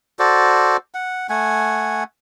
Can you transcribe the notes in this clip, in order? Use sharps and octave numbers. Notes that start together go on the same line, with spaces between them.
F#4 A4 C5 D5
F#5
A3 F#5 G#5